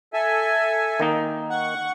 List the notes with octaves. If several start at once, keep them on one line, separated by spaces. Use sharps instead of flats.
A4 E5 G#5
D#3 A#3 D#4
F#5 C#6